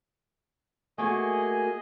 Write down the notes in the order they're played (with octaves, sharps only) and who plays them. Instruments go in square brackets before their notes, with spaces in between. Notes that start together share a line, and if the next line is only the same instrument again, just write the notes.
[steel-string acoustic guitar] A3 A#3 F#4 [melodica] G#4 D#5 [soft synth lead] G#5